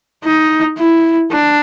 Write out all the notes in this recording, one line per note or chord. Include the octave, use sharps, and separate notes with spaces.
D#4
E4
D4